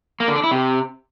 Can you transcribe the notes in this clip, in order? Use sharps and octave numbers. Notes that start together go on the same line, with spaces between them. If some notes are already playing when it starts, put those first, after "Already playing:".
A#3
D3
D4
E4
C3